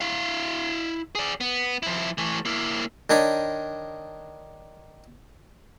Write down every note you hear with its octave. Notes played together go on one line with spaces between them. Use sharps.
E4 F5
G#4 D5
B3
F3 E4
E3 A3
A#3 E4
D#3 D4 D#4 C#5 B5